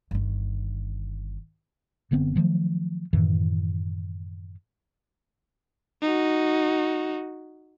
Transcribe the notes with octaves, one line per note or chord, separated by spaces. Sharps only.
G1 D#3
F#1 D3 B3 C4
D#3 F3 F#3 A3
F#2 A2 D#3 E3
D#4 F#4